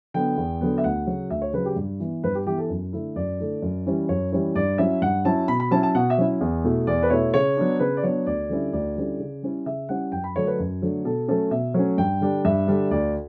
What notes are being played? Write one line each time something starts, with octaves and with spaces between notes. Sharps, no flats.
D3 F#3 B3 G5
E2
D3 F#3 B3
E5
D2 F#5
C#3 F#3
D2 E5
C#5
C#3 F#3 B4
G4
G2
E3 B3
G2 B4
G4
E3 B3 G4
A4
F#2
D3 A3 E4
F#2 D5
D3 A3 E4
F#2
E3 G3 C#4 E4
F#2 C#5
E3 G3 C#4 E4 C#5
G2 D5
F#3 C#4 E4 E5
G2 F#5
F#3 C#4 E4 A5
B2 B5
B5
F#3 C#4 E4 A5
A5
B2 F#5
E5
F#3 C#4 E4
E2
B2 A3 E4
E2 D5
B4
B2 A3 E4 C#5
C#3 C#5
F#3 B3 D4
C#3 B4
D5
F#3 B3 D4 C#5
D2 D5
D3 G3 C#4 E4
D2 D5
D3 G3 C#4 E4
C#3
G3 C#4 E4
C#3 E5
G3 C#4 E4 F#5
F#2 G5
B5
D3 F#3 A3 D4 C#5
B4
F#2
D3 F#3 A3 D4
B2 A4
F#3 A3 C#4 A4
B2 E5
F#3 A3 C#4
G2 G5
D3 G3 D4
G2 E5
D3 G3 D4
D2 D5